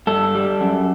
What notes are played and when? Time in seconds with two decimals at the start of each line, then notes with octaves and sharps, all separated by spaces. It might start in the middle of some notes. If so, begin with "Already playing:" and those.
0.07 G2 A4
0.35 G3
0.61 F#2